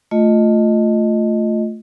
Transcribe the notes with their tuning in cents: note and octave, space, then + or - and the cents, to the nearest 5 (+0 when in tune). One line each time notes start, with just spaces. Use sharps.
A3 +5 F4 +10 D#5 +0